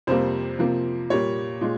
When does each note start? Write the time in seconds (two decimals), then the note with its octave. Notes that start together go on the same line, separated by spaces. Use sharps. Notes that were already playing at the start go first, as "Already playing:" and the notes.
0.07 F2 C3 G3 A#3 C5
0.59 C3 F3 A#3
1.10 A#2 G3 A#3 C#5
1.61 A#2 G#3